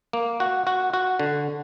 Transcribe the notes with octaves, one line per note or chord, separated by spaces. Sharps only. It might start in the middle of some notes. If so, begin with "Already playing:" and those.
A#3
F#4
F#4
F#4
D3